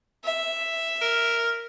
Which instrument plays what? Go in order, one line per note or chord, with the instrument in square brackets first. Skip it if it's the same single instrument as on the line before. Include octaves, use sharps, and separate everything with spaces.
[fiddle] E5
[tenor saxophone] A#4